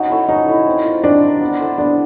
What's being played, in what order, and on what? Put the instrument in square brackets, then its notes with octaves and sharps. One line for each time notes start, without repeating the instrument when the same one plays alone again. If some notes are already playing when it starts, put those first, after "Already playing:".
Already playing: [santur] C#4 F#4 [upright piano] D#4
[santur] E4 A4 C#5
[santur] C#4 [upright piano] D#4
[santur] E4 A4 C#5
C4
F4 A#4
[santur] C4 [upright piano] D4
[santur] F4 A#4
B3
E4 A4 C5
[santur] B3 [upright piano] D4